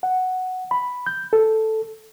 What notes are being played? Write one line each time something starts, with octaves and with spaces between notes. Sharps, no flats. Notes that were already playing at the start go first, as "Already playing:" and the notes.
F#5
B5
G6
A4